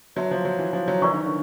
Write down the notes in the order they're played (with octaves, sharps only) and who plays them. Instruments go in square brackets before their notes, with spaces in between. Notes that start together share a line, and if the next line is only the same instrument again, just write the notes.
[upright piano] F#3 [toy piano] B4 E5 A5 C6
[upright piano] F3
F#3
E3
F3
F#3
[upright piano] E3 [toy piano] A#4 D5 F5 A#5 C#6
[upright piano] D#3
D3